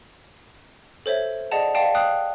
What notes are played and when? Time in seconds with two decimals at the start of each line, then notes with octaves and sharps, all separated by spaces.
1.06 A4 C5 C#5 E5
1.52 G#4 D5 D#5 F#5 A5
1.75 D5 F5 G5 A5
1.95 F5 G5 D#6 F#6